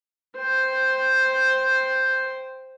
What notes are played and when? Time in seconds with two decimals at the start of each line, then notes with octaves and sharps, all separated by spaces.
0.37 C5 G5